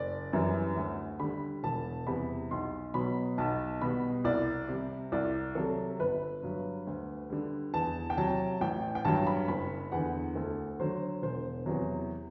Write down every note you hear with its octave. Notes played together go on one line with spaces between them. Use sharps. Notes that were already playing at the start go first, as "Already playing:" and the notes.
Already playing: F#1 D5
F#2 E3 G3
D2
D3 G3 B5
E1 A5
E2 C3 G3 B5
B1 C6
B2 F#3 B5
B1 A5
B2 G3 B5
C2 D5
C3 G3
C2 D5
C3 F#3 A4
G1 B4
G2 F#3
D2
D3 G3
E2 A5
G5
C3 F#3 A5
A1 G5
G5
G2 F#3 A5
B5
F#1 B5
E2 D3 F#5
D2 A4
D3 F#3 C5
E1 C5
E2 C3 F#3